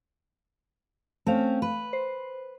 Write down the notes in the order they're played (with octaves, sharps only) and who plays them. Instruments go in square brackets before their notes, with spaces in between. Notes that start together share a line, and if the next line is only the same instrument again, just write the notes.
[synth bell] A3 F5 [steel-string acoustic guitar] C4 C#4
[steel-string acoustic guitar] B4
[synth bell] C5